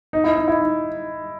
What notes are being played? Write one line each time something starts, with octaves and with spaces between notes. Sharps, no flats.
D#4
E4
D#4
E4
D#4